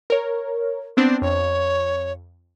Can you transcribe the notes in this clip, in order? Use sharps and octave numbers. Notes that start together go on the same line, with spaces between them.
A#4 C#5
B3 C4 D4 C5
F2 C#5